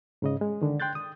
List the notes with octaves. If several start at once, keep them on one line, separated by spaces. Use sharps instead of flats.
G#2 C#3 D#5
G#3
D3 D#3
G5 C6 F#6 G6 A6
D#6